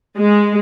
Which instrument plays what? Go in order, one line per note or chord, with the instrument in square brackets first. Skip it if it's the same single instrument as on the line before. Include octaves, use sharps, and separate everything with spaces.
[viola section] G#3